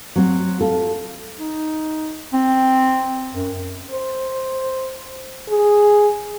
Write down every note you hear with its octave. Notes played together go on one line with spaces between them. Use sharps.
F#3 C4
F4 A4
D#4
C4
F#2
C5
G#4